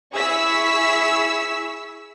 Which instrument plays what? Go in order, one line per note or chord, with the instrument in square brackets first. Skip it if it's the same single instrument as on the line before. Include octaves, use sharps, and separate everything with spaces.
[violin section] E4 G#4 C#6 E6 B6